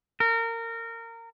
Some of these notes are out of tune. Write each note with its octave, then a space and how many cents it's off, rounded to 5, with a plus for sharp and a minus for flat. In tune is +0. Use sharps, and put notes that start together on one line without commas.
A#4 -25